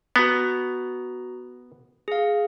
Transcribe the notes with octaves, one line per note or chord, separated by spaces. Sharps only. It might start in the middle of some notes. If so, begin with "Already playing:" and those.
B3 F#4 A#5 A#6
G#4 F5